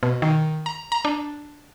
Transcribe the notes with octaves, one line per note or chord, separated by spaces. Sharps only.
B2
D#3
A#5
A#5
D4